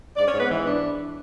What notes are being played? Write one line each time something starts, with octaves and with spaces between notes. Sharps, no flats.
G#2 D4 D5
C#4 C#5
G#2
B3 B4
E3
D4